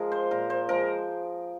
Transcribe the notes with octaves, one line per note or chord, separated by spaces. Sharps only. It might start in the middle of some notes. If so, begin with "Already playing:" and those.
Already playing: F3 G#3 G#4 A#4
C5
A#2 A#4
C5
F3 G#3 A#4